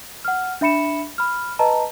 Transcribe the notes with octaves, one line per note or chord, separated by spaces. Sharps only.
F#5 F6
D4 E5 B5 C#7 E7
B5 F6
B4 D#5 A5 A#5